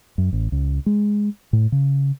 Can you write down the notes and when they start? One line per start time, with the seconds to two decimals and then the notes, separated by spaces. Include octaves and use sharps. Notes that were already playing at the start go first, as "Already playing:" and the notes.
0.18 F#2
0.33 A1
0.52 C#2
0.86 G#3
1.53 A2
1.72 C#3